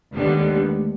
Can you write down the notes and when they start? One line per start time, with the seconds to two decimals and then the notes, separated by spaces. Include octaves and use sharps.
0.13 D#2 D3 G3 G#3 B3
0.37 G#3
0.42 A3
0.72 A3